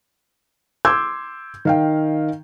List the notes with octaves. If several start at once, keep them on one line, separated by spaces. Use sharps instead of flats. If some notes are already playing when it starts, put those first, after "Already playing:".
C6 D6 E6 G6 G#6
D#3 F5 G5